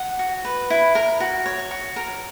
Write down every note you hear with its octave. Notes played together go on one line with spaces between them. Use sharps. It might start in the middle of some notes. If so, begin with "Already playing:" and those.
Already playing: F#5
F#4
B4
E4
A#4
F#4
C#5
F#4
A#4